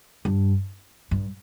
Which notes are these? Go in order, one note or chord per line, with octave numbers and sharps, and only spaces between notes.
G2
G2